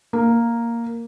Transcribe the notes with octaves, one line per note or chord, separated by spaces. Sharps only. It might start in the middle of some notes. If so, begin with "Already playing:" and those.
A#3